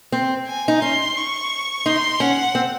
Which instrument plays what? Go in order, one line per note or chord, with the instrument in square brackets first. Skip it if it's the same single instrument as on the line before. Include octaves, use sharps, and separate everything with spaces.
[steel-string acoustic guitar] C4
[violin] G#5
[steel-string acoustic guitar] D#4
[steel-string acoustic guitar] C#4 [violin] C6
[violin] C#6
[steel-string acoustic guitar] D#4 [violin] C6
[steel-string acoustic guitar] C#4 [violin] F#5
[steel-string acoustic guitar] C4